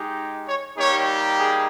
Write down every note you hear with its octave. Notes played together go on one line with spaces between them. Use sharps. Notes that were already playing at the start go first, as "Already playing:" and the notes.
Already playing: G#3 D#4 G4
C#5
G3 A#3 D#4 G4 C#5
G#4